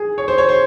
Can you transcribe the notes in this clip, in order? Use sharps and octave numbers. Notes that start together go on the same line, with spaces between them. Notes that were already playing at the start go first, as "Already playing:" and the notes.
Already playing: G#4
C#5
C5
C#5
C5